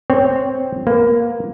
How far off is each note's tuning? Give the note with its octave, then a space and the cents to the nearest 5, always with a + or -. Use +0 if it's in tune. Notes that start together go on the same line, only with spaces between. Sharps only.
C4 +0 C#5 +0
A#3 +10 B4 +30